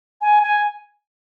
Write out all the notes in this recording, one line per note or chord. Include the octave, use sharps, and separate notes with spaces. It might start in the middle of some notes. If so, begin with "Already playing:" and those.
G#5
G#5